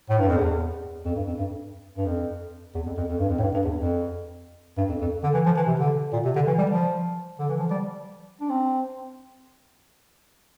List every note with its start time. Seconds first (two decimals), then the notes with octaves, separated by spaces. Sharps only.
0.10 A2
0.19 G2
0.28 F2
0.37 E2
1.05 F2
1.16 G2
1.28 F2
1.39 G2
1.98 G2
2.06 F2
2.75 E2
2.86 F2
2.97 F2
3.08 F2
3.20 G2
3.29 F2
3.38 A2
3.42 G2
3.54 G2
3.64 E2
3.76 F2
4.78 G2
4.89 F2
5.01 F2
5.23 D3
5.34 E3
5.46 F3
5.57 E3
5.67 C3
5.79 D3
6.13 A#2
6.25 C3
6.36 D3
6.47 E3
6.58 G3
6.70 F3
7.39 D3
7.49 E3
7.59 F3
7.71 G3
8.41 D4
8.50 C4